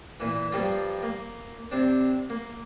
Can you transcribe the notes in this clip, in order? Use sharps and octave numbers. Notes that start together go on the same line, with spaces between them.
A#2 E3
G2 F3 G3 A#3 F4
A#3
C3 C4 D4
A#3